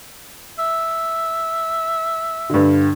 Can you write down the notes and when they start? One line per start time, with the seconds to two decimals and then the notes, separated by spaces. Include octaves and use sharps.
0.59 E5
2.50 G2 D3